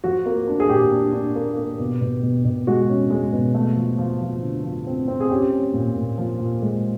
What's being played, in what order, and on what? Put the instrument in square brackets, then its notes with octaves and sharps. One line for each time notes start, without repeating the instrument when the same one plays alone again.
[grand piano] F3 F#4
A#3
D4
G#4
A#2 G4
D4
D4
A#3
A#3
B2
B2
B2
B2
G#3 F#4
C#4
G#3
B2
A3
F3
F3
F3
D3
F3
C4
C4
G#4
C#4 G4
C#4
A#2
A#2
F3
A#2
G#3